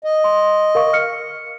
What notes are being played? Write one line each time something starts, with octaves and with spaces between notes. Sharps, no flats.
D#5
C6
A#4 F5 C#6
F6 C#7